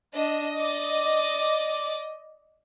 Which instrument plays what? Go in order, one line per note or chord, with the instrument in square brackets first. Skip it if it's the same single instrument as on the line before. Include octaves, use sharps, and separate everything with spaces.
[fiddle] D4 [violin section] D#5
[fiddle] D5 D6